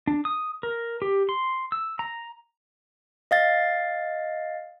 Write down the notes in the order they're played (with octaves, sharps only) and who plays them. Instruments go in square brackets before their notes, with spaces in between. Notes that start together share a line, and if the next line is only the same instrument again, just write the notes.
[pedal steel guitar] D4
D#6
A#4
G4
C6
E6
A#5
[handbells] D#5 F5 A6